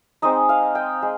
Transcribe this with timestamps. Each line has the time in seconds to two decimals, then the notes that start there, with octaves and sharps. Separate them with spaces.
0.22 G#3 C4 D#4 D#5
0.49 F5
0.75 G5
1.02 G#3